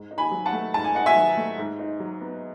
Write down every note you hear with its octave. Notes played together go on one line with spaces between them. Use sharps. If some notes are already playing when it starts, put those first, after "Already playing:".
Already playing: G#2
D#4
G#5 B5
F#3
F#5 A5
A3
G#2 A5
G#5
D#4 F#5
E5 G#5
F#3
A3
G#2
D#4
F#3
B3